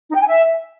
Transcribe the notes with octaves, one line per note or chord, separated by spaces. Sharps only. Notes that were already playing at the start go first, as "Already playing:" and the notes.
D#4
G5
G#5
E5